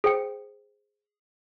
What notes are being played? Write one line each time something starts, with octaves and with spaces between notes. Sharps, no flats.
G#4 C5 G5 C#7